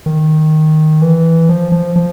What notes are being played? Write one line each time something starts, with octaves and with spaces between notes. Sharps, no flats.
D#3
E3
F3
F3
F3